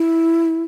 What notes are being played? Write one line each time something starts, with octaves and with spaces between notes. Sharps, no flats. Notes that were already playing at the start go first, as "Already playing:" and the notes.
Already playing: E4